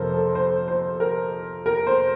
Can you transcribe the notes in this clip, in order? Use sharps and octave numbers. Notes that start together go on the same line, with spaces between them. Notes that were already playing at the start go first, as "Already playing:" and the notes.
Already playing: F2 C3 F3 A4 A#4 C5
A4
C5
C5
A#4
A#4
C5